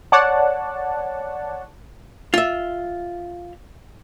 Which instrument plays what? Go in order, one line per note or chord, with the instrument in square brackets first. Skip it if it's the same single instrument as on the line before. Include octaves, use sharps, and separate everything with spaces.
[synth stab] C#5 D5 F#5 A5
[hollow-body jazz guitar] F4 E5